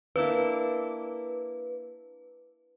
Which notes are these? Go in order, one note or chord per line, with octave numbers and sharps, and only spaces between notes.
A#3 D4 E4 B4